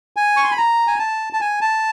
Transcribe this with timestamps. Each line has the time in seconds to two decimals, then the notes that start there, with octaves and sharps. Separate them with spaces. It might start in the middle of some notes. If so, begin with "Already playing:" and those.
0.16 G#5
0.37 C#6
0.44 C6
0.51 B5
0.58 A#5
0.87 G#5
0.99 A5
1.33 A5
1.41 G#5
1.61 A5